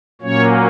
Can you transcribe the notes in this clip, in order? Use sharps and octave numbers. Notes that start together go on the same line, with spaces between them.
A#2 F#3 A#3 C#4 C#5